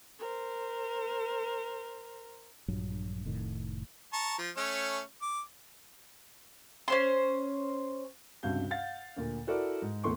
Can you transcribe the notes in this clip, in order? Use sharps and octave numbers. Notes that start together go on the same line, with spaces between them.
A#4 C5
A#1 G2 F#3
F1 A2 D#3
A5 A#5 C#6
F3
A3 C#4 C#5
D6
C#4 C5 C6
C#2 G2 C3 F#4 F5 G6
F5 F#5 A6
D2 A#2
E4 F#4 A4 A#4 D5
G#2
D#2 A3 B3 C6 C#6